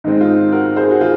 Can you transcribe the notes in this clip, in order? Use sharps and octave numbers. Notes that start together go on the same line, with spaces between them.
G#2 D#3 G#3 C4 D#4
F4
F#4 A#4
G#4 C5
F#4
F4 G#4